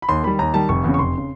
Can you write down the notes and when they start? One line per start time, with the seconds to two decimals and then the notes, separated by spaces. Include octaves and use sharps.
0.02 B5
0.09 D#2 C6
0.24 D#3 G3 B5
0.39 D#2 A#5
0.54 D#3 G3 A5
0.69 F1 C#6
0.84 E2 C#3
0.94 C#6
0.99 F1 C6
1.18 C#3